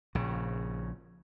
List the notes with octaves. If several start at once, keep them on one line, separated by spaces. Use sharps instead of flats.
A#1 C#3